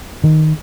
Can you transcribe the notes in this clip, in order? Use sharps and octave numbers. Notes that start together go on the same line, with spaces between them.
D#3